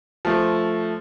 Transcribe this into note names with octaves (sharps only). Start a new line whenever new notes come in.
F3 A3